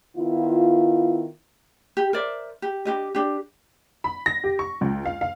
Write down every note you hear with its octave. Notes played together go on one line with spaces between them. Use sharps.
D#3 B3 E4 F4
G4
A#4 C5 D5 E5
G4
D4 F4 G4 D#5
D4 G4
B5
A#6
G4
C#6
C#2
F5
F5